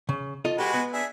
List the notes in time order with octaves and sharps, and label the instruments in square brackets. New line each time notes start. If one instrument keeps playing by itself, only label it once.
[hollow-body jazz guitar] C#3
F4 A4 D#5
[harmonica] G#3 F#4 B4 [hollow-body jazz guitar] G4 A4
[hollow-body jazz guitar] B3
[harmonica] D4 G#4 E5